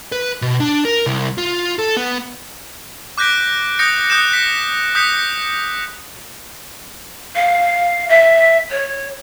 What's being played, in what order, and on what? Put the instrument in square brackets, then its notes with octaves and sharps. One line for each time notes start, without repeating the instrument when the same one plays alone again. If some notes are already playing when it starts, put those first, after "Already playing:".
[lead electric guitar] B4
B2
D4
A#4
C2
F4
A4
B3
[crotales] D6 F#6 G6 A#6 B6 D7
D#6 G6 A#6 C#7
D#6 F#6 G6 C#7 E7
B6
D#6 G6 B6 C#7
C#7
[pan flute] F5
E5
C#5